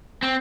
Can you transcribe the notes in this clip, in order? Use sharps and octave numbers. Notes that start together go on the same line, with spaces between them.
C4